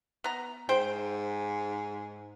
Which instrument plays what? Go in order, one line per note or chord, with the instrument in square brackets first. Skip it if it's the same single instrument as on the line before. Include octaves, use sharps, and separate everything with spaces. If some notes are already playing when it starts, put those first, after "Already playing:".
[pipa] B3 A#5
[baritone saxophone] G#2 [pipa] C5 G5